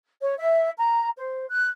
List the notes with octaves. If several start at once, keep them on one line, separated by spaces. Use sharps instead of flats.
C#5
E5
A#5
C5
F#6